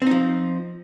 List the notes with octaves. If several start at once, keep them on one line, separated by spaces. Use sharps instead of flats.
F3 C4 D#4